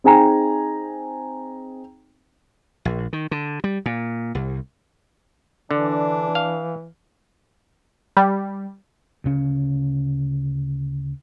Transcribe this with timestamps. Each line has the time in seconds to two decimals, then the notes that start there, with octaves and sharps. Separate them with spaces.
0.04 C4 D#4 G#4 G5 G#5 A#5
2.85 A#1
3.13 D#3
3.31 D3
3.64 G3
3.86 A#2
4.35 C2
5.71 D3 E3 D4
6.35 F5
8.17 G3
9.24 D2 C#3 C#4